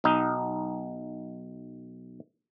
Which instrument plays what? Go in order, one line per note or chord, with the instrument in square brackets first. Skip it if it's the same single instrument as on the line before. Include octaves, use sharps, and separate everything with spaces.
[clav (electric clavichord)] B1 D#4